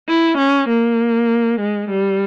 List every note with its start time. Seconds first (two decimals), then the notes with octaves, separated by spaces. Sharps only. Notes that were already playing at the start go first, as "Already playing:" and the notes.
0.08 E4
0.38 C#4
0.69 A#3
1.60 G#3
1.90 G3